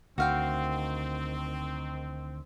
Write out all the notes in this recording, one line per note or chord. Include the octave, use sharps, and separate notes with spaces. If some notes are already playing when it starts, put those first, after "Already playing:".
D2 D#3 C4 F#4 F5 G5